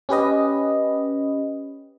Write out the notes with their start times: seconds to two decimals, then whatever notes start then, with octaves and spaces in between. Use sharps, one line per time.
0.09 C#4 G4 B4 D#5